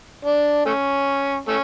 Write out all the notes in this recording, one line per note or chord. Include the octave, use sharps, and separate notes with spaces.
D4
A3 C#4
A3 C#4